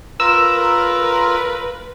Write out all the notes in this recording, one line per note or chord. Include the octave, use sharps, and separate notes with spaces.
F4 A#4 B4 E6